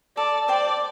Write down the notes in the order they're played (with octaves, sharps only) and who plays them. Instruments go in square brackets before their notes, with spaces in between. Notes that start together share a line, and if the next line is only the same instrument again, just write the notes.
[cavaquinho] A4 [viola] D5
[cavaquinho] C5 G5 D6 [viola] D5